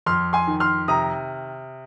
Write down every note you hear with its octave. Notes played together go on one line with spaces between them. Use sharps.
F2 C6 F6
G#5 C6
D#3
C6 F6
C3 A#5 D#6